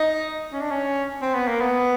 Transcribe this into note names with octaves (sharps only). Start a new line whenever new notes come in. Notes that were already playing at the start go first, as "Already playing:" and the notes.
Already playing: D#4
C#4
D4
C#4
C4
B3
A#3
B3